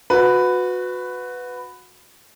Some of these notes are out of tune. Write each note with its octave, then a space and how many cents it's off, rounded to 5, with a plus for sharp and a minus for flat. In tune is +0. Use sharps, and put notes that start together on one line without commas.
F#4 -25 B4 +10